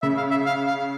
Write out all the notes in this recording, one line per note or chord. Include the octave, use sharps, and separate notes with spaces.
C#3 E5
F5
E5
F5
F5